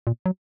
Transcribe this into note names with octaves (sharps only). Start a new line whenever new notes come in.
A#2
F#3